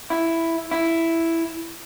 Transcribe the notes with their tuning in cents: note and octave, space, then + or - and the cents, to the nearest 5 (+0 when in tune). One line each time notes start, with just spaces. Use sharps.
E4 +5
E4 +5